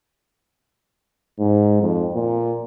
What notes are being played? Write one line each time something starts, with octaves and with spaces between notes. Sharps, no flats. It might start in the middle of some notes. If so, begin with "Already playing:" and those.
G#2
F2
A#2